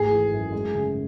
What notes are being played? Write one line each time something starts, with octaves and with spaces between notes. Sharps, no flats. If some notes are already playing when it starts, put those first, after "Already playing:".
Already playing: G#1 D2 G#4
E3
F#2
G#3
C#3